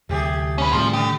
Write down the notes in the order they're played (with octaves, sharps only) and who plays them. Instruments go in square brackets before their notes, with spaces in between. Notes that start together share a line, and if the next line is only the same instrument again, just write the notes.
[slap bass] D2 C3 F#3 [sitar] A3 G4 G#4
[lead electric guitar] C#4 B4
[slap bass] A2 D#3 G3 [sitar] C3 [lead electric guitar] F3
[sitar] C#3 [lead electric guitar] G4